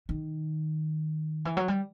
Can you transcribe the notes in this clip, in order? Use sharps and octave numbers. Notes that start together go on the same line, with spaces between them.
D#3
E3
F#3
G3